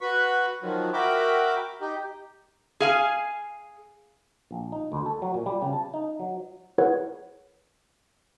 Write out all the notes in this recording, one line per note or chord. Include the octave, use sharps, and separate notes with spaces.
F#4 B4 B5 C#6
D#3 F3 F#3
F#4 A#4 E5 G5 B5 D6
D#4 G4
G#4 F5 G#5
A#1
D#4
D2
A4
F#3
A#2
G3
C#3
A5
D#4
F#3
E4 G#4 A#4 B4 C#5 F#5